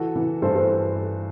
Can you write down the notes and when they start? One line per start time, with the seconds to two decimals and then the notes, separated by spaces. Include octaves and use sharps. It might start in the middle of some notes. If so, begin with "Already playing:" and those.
Already playing: E3 F#4 A4
0.16 E3
0.42 G2 A4 C5
0.55 A4 C5